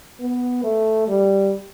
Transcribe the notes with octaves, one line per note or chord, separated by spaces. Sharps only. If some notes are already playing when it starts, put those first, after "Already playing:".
B3
A3
G3